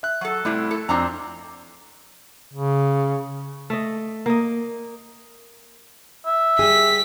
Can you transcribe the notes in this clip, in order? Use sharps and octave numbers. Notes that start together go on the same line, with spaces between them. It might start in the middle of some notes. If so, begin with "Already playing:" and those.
E5 F#6
F#3 A4
A2 C3 G3 A3 E4
A4
F2 C4 D4 A#5
C#3
A3 D#5
A#3 D#5
E5
G3 G4 G#4 B6